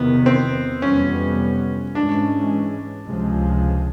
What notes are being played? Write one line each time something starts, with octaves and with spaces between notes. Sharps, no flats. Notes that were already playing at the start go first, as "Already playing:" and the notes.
Already playing: E2 C3 D#3 B3
C4
F2 C3 E3 G3 B3 C#4
G#2 E3 G#3 C#4 D4
C#2 C3 F3 G#3